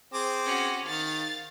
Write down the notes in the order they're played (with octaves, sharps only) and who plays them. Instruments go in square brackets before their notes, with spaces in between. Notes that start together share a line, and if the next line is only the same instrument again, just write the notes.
[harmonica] C4 G#4 D6
[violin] C#4 F#4
[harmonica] D#3 [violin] F5 A6